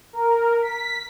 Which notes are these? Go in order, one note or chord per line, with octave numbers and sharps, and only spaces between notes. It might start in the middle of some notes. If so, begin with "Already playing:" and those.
A#4
B6